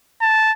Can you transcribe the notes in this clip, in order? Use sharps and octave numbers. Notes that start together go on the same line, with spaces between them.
A5